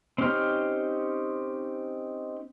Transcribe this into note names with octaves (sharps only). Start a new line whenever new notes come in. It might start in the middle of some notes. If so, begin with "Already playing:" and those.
C4 C#4 D#4 G4 F6